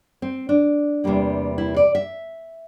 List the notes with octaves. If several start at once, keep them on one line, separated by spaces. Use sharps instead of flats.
C4
D4
E2 C3 G3 A#3
E4
D5
E5